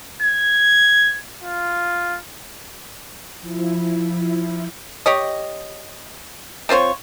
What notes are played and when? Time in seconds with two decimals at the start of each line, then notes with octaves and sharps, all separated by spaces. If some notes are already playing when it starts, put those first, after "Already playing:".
0.22 G#6
1.43 F4
3.40 F3 E4
5.06 G4 C#5 D#5
6.69 C4 F4 C5 C#5